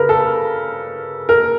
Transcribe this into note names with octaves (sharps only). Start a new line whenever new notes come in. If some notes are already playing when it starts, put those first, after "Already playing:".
Already playing: C#3 A#4 B4
A4
A#4